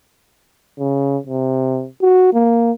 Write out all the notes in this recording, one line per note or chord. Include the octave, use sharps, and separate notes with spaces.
C#3
C3
F#4
A#3